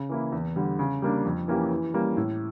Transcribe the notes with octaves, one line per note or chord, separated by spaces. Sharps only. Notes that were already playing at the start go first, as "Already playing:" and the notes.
Already playing: C#3
E3 A#3 E4
E2
D3 G3
C#3
G3 A#3 D4
F2
E3 A#3 C#4 G4
E3
G3 A#3 C#4
A2